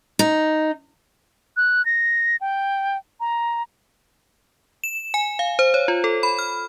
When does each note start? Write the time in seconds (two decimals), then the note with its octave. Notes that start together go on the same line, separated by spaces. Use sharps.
0.19 D#4
1.57 F#6
1.86 A#6
2.41 G5
3.20 A#5
4.84 E7
5.14 G#5
5.39 F5
5.59 C5
5.74 C#5
5.88 F4
6.04 A4
6.23 B5
6.39 F6